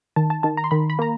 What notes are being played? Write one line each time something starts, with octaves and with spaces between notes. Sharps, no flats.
D#3 A5
A5
D#3 A5
A#5
C6
D#3 B5
B5
A#3 A#5